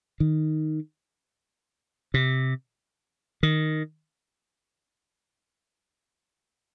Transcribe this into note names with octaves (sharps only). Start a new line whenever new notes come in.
D#3
C3
D#3